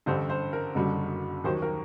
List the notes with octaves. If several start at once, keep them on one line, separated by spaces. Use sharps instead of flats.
A1 G2 D3 C5
C5
A#4
F#1 F#2 D3 G3
D#2 D#3 F#3 C5
A#4